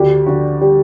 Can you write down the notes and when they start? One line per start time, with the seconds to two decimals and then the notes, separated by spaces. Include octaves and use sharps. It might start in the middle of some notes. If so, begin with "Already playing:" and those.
Already playing: D2 G4
0.26 D3 F#4
0.61 G3 G4